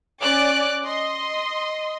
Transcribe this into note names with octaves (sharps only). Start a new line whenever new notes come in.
C#4 D5 D6 F#6
D#5 C6